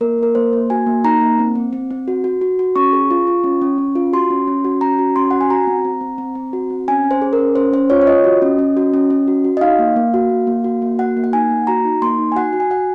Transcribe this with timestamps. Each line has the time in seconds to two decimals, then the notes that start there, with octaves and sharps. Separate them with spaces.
0.01 A#3 A#4
0.18 A#3 A#4
0.35 A#3 C5
0.53 A#3
0.70 F#4 G#5
0.86 A#3
1.04 D#4 A#5
1.21 A#3
1.39 C4
1.55 C4
1.73 C4
1.91 C4
2.08 F#4
2.24 F#4
2.41 F#4
2.59 F#4
2.76 C#4 C#6
2.93 G#4
3.11 F4
3.27 F4
3.44 C#4
3.62 C#4
3.78 C#4
3.95 F4
4.13 F#4 C6
4.30 C#4
4.47 C#4
4.64 F#4
4.81 C#4 A#5
4.99 F#4
5.16 C#4 C6
5.31 F#4 F#5
5.41 G#5
5.50 F#4 A#5
5.67 C4
5.85 C4
6.01 C4
6.18 C4
6.35 C4
6.53 F#4
6.70 C4
6.88 C#4 G#5
7.04 C#4
7.11 C5
7.22 G#4
7.33 A#4
7.39 C#4
7.56 C#4 C5
7.73 C#4 C5
7.90 F4 C#5
8.01 C#5
8.07 F4 D#5
8.24 F#4
8.42 C#4
8.59 C#4
8.77 F#4
8.94 C#4
9.10 C#4
9.28 F#4
9.45 F#4
9.57 D#5
9.61 D#4 F5
9.79 A#3
9.96 A#3
10.14 F#4
10.30 A#3
10.47 A#3
10.64 F#4
10.82 A#3
10.98 F#4 F#5
11.17 A#3
11.24 F#5
11.33 D#4 G#5
11.50 A#3
11.67 F#4 A#5
11.85 D#4
12.02 A#3 C6
12.19 D#4
12.32 G#5
12.36 F#4 F#5
12.53 F#4
12.60 G#5
12.70 F#4 F#5